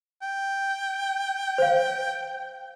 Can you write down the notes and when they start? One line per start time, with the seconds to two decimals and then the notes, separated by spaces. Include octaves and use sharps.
0.22 G5
1.58 C5 F5